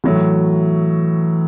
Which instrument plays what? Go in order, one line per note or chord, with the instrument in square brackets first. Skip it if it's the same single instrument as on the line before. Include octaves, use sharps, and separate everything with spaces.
[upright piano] A2 F#3 A3 [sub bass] E3